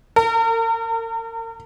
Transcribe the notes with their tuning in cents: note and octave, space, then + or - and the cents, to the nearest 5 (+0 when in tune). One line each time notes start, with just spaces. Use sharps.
A#4 -40